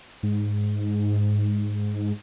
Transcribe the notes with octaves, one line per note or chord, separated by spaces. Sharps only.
G#2